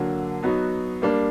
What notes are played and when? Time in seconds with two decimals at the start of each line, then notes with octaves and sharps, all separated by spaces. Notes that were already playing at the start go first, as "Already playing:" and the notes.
Already playing: D3 F#3 A#3
0.43 F#3 B3 D#4 F#4
1.02 G3 A#3 D4